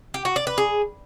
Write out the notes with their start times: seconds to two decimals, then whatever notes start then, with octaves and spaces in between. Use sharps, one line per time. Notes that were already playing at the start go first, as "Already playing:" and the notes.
0.14 G4
0.25 F#4
0.36 D5
0.47 B4
0.58 G#4